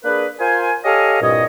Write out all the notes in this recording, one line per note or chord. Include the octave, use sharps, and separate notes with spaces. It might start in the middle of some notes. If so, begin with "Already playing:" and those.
A#3 D4 G#4 B4
F4 A#4 C5 G#5
G4 A4 C#5 D#5 F5 G#5
C2 G2 A#2 C#5 D#5